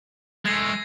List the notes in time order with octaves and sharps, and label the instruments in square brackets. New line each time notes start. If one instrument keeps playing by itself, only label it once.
[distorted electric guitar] G#3 A3 [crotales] G#6 A#6 C7